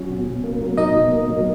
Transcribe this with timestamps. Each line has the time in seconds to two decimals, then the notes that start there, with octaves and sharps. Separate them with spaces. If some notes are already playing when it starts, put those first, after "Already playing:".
Already playing: F#3 C#4
0.09 B2
0.26 B2
0.44 A#3
0.61 F#3
0.77 B2 D#4 D#5
0.95 B2
1.12 A#3
1.30 F#3